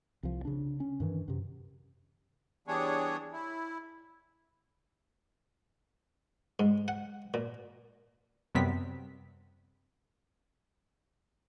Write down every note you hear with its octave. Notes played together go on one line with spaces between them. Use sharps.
C2 F3
C#3 D4
C#4
G2 D#3 E3
F#2 C3
E3 G3 B3 D4 G#4 C#5
E4
G#2
F#5
A#2
F#2 C3 G3 B3 C4 B6